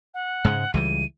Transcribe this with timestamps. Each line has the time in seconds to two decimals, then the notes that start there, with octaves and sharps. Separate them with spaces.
0.14 F#5
0.45 G#2 C#3 G#3
0.74 C#2 E3 G3 D#7